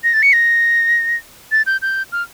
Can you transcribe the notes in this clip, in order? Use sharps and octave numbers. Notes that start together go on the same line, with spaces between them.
A#6
A6
C#7
A#6
A6
G6
G6
F6